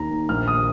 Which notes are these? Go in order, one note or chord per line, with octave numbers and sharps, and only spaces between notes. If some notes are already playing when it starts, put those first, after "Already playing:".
Already playing: D#2 D#3 A#5
D#2
A#1 F6
D#6